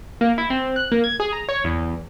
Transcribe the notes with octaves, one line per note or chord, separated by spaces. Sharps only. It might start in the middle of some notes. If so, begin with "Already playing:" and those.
A#3
E4
C4
F#6
A#3
G#6
G#4
A#5
C#5
E2